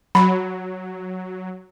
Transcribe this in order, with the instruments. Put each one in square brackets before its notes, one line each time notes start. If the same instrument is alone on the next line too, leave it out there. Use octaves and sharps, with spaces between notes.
[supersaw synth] F#3 [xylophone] B5